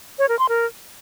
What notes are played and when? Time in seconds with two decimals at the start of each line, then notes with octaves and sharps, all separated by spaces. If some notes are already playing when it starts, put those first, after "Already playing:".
0.19 C#5
0.29 A#4
0.39 C6
0.49 A#4